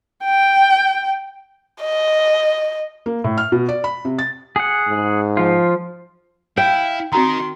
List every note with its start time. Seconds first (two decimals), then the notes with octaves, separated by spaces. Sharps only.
0.24 G5
1.82 D#5
3.06 A#3
3.24 A2
3.38 F6
3.52 B2
3.69 D5
3.84 B5
4.05 C3
4.19 A6
4.56 G#4 F#5
4.87 G#2
5.37 F3 F4
6.57 E4 F5 G5
7.13 D#3 C4 F#4 A#5 C6